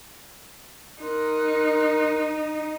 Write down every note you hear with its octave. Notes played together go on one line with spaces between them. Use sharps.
D#4 A#4 C6 F#6